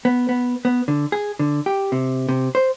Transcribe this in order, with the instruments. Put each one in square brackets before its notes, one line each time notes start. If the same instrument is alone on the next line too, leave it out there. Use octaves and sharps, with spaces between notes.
[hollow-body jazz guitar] B3
B3
B3
D3
G#4
D3
G4
C3
C3
C5